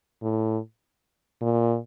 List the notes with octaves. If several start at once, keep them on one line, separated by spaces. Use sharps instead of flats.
A2
A#2